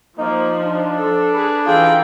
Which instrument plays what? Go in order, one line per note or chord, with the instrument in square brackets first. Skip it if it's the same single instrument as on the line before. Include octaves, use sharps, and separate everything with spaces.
[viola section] F3 [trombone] A#3 [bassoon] D#4
[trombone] D4
[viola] A4
[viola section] G#4 B4
[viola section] E3 D#4 A4 [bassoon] F4 [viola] G#4 G5